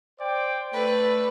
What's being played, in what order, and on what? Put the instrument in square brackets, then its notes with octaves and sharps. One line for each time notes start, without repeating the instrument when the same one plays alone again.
[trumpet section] C5 D5 G5
[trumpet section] A3 [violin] B4 D5